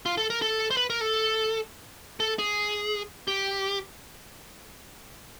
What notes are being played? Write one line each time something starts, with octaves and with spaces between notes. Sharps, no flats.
F4
A4
A#4
A4
C5
B4
A#4
A4
A4
G#4
G4